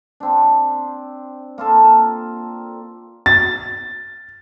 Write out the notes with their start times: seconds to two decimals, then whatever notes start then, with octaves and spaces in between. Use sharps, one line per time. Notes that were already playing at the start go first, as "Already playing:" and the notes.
0.20 C4 D4
1.58 A#3 F4 A4
3.26 A6